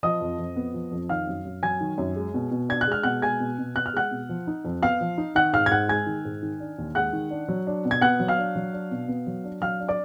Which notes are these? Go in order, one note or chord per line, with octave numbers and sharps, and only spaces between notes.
F3 D#5 D#6
F2
F2
B3
F3
F2
D#3 F5 F6
F#2
F#2
F#3 G#5 G#6
D#3
F#2
G#3
B2
B2
D4 G#6
F#6
G#3 F6
B2 F#5 F#6
G#3 G#5 G#6
B2
B2
B3 F#6
F6
G#3 F#5 F#6
B2
F3
D#4
F2
B3 F5 F6
F3
D#4
D#3 F#5 F#6
G#2 F5 F6
G#6
G#2 F#5 F#6
G#3 G#5 G#6
D#3
G#2
D#3
D4
D#2
G#3 F#5 F#6
D#3
D4
F#3
D4
B2
G#6
B3 F#5 F#6
F#3
F5 F6
D4
F#3
D4
B2
B3
F#3
D4
F#3 F5 F6
D4
D5 D6